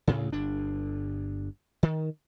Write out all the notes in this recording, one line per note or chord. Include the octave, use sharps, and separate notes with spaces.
D2 A2 C#3
G1 D4
D#3